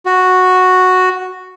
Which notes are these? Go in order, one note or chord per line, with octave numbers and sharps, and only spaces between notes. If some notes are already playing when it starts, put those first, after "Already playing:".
F#4